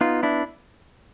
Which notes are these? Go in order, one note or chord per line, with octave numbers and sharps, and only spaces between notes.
B3 D#4 F4
D4 E4